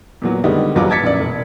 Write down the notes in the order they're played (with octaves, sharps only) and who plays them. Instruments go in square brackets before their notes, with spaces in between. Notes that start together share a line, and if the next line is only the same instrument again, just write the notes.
[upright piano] E2 A#2 F#3
D3 D#3 G3 G#3 B3 D#4
A1 D#2 F#3 F4 B4 D6
A5 D6 G#6 A6 B6 C#7
A#1 F#2 D5
E1